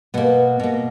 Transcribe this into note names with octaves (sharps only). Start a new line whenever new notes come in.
B2 A#3 B3
B2 A#3